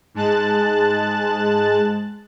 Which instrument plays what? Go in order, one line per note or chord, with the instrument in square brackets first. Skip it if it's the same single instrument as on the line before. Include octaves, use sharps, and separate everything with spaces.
[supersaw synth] G#2 G#3 A5 F#6 A6